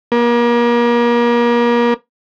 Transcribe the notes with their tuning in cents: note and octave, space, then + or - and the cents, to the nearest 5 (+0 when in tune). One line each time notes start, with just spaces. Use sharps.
A#3 +35